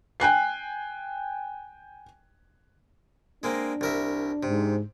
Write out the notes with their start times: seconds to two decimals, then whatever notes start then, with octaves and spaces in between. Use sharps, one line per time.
0.20 G5 G#5 F#6 C7
3.43 G#3 A#3 C4 D4
3.81 C2 A#4 E5
4.43 G#2 C3